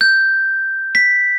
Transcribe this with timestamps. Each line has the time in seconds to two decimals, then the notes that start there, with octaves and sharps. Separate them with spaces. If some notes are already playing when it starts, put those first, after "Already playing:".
0.01 G6
0.95 B6